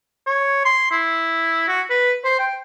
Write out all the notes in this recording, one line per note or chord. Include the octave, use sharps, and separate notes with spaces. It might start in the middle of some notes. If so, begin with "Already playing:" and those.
C#5
C6
E4
F#4
B4
C5
G5